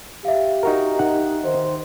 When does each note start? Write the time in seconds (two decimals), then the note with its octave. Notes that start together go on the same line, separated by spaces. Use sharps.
0.25 G4 E5 F5
0.63 D#4 F#4 A#4
0.99 D#4 F#5
1.45 D#3 C5